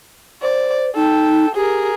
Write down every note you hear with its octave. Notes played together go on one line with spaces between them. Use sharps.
C5 D5
D#4 A4 G5
G4 G#4 A#4